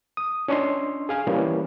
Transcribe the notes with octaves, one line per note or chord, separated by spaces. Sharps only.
D#6
C#4 D4 C#5 D#5 C6
G#4 F5 G#5
E3 G3 A#3 C#4